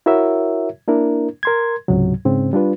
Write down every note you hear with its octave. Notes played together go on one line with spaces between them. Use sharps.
E4 F#4 A#4 C#5 E5
A#3 D4 E4 A#4
A#4 C6 G#6
C#2 G#2 C3 F#3
G#2 C#3 C4
G3 D4 F4 B4